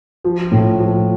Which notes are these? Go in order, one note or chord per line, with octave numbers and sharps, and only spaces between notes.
F3
A2
F3